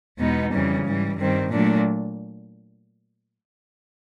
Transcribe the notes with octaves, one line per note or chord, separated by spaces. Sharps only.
E2 B2 G#3 B3 D#4
F2 C#3 E3 G3
G#2 E3 G3
G2 D#3 G3 C4
A#2 F#3 A3 D4